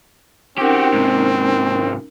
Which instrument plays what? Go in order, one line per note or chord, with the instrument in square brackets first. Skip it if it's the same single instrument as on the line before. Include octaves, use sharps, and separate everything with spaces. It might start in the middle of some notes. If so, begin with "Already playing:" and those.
[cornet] C4 [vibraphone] C#4 D#4 A#4 [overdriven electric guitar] F#4 G4
[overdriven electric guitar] G#2 C3